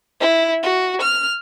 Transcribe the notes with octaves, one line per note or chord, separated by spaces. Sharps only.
E4
F#4
F6